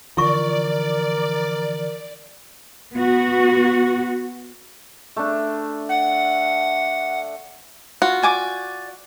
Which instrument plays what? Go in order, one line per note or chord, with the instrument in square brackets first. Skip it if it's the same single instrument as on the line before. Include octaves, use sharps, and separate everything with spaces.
[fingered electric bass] D3 E3 F3 [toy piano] E4 F4 C#6 [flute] A#4 [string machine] D5
[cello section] B3 F#4
[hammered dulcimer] A3 D4
[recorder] F#5
[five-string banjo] F4 F#4
[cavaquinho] D5 G#5 D6